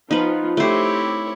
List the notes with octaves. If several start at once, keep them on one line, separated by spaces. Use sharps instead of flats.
F3 B3 D#4 F4 B4
A3 C4 E4 G4 C5 C#5